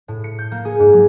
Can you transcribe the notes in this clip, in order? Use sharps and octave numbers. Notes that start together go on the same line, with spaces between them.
A2
C#7
G6
A#3
G#4
G#2
F#3